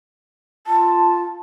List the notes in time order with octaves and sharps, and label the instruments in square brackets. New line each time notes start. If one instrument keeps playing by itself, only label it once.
[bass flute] F4 [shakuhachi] A5